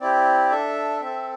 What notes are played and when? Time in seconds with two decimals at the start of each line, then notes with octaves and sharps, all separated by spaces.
0.01 C4 E4 G4 D5
0.51 D4 A4 E5
1.01 C4 A4 E5